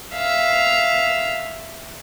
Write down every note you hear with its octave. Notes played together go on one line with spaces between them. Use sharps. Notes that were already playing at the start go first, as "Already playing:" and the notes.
E5 F5